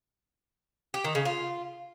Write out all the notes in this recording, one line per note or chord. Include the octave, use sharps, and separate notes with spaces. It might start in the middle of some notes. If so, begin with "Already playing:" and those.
G4
D#3
C#3
F4